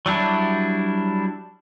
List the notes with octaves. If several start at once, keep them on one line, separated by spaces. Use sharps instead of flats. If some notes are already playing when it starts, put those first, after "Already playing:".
F#3 G3 D4 E4